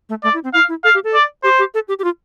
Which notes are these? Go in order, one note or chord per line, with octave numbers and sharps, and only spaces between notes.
A3
A3 D5
E4
C4
E4 F5
E4
A4 F5
G4
A4
D5
G4 C5
G4
A4
G4
G4
F4